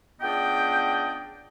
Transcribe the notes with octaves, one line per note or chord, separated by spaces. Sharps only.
C#2 B3 D4 D5 D#5 G5